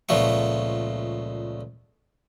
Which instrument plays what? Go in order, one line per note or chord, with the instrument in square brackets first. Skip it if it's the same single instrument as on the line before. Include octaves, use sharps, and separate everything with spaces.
[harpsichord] C#2 A#2 F3 A3 B3 C#6